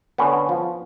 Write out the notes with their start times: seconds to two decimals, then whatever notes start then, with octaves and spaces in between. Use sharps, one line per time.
0.18 D3 B3 C#4
0.49 F3